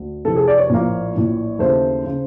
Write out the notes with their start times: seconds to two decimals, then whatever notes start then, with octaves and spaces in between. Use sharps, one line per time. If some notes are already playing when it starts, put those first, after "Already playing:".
Already playing: D2
0.25 F1 F2 C3 E3 A4
0.36 G#4
0.48 D5
0.59 C#5
0.70 A#1 A2 F3 A#3
1.15 A#1 A2 E3
1.59 D#2 C#3 E3 A3 C5
2.04 C#3